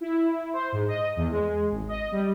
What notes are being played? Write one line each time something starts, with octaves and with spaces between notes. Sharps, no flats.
E4
C5
G#2
D#5
E2
G#3
G#1
D#5
G3